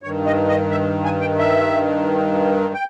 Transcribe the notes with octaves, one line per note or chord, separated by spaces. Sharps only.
G2 D#3 C#5
D#5
D#5
E5
G#5
G5
E5
G5